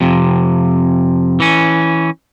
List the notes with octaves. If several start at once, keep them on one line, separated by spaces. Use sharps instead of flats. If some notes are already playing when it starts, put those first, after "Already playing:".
F2 C3
E3 C#4